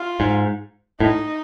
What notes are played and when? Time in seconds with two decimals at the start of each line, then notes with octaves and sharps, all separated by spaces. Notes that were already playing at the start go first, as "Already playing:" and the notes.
Already playing: F4
0.20 G#2
1.00 A2 D#4